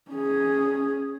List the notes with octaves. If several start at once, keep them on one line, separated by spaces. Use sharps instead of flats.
C#4 G#4